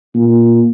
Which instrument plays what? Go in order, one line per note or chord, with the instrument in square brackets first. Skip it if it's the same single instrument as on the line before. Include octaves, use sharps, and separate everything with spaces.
[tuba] A#2